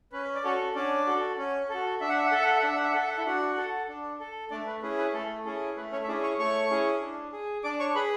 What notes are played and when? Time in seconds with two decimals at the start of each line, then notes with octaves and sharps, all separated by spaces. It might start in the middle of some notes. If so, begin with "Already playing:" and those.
0.12 C#4 B4
0.35 D5
0.44 C#4 F#4 A4 C#5
0.75 C#4 D4 D5
1.07 F#4 A4
1.38 C#4
1.69 F#4 A4
2.01 D4 E5
2.09 F#5
2.17 E5
2.26 F#5
2.32 A4 E5
2.42 F#5
2.51 E5
2.59 F#5
2.63 D4 E5
2.76 F#5
2.84 E5
2.92 A4 F#5
3.01 E5
3.09 F#5
3.17 E4 E5
3.26 D4 F#4 F#5
3.57 A4
3.88 D4
4.20 A4
4.51 A3 D4 D5
4.67 B4
4.82 C#4 E4 G#4 B4
4.98 B4
5.13 A3 A4
5.45 C#4 E4 G#4 A4
5.76 A3 B4
5.92 C#4 C#5
6.03 E5
6.07 C#4 D4 E4 G#4 D5
6.23 C#5 C#6
6.39 A3 C#5 C#6
6.70 C#4 E4 G#4
7.02 D4
7.32 G#4
7.64 D4 D5 D6
7.80 C#5 C#6
7.95 G#4 B4 B5